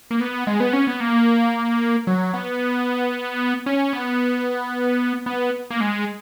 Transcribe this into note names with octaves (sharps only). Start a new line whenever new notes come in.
A#3
B3
G#3
B3
C#4
B3
A#3
F#3
B3
C#4
B3
B3
A#3
G#3